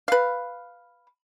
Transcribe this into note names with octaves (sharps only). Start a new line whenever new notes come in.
B4 F5